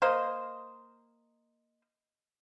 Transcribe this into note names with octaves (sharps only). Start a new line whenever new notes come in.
A#3 C5 D#5